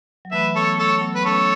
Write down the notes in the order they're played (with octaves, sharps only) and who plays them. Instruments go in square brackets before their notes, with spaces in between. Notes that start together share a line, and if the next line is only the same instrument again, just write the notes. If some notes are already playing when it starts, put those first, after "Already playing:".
[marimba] F#3
[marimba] E3 A3 [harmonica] B4 E5
[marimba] F#3 B3 [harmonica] A4 C#5
[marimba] A3 C#4 [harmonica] A4 C#5
[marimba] F#3 B3
[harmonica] B4
[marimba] A3 C#4 [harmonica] A4 C#5